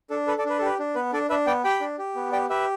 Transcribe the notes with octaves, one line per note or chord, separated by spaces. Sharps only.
D4 A4
A4 B4
A4 D5
D4 B4
A4
G4 B4
D4
B3 B4
D4 A4 D5
D4 B4 E5
B3 D5 G5
G4 G5 B5
D4
G4
B3
G4 D5 G5
G4 B4 E5